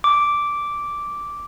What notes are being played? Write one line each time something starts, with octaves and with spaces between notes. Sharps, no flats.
D6